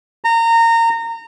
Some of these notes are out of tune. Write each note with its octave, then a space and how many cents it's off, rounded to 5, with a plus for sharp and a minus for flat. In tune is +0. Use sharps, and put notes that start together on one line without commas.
A#5 -25